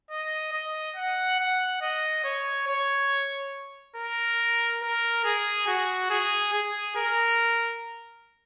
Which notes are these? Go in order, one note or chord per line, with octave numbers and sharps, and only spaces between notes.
D#5
D#5
F#5
F#5
D#5
C#5
C#5
A#4
A#4
G#4
F#4
G#4
G#4
A#4